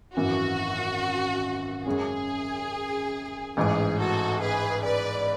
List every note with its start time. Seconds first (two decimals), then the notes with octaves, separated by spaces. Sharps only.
0.16 G#1 F#2 E3 F#4
1.86 F#2 C#3 G#3 C#4 G#4
3.57 A1 G#2 E3 G#4
3.99 F#4 A4
4.42 G#4 B4
4.85 B4 D5